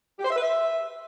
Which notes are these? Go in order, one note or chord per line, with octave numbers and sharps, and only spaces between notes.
G4
C5
E5
B4
E5